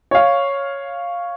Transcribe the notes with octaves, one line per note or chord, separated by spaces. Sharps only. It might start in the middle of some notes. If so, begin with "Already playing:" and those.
C#5 F5